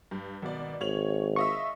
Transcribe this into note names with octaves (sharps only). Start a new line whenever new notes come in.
G2
G#1 B2 D5
G#1 C#5 F7 F#7
F4 D#5 E5 C#6